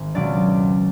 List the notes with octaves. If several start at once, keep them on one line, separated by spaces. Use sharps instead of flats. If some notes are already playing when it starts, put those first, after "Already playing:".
Already playing: G#1
C#2 B2 F#3 D5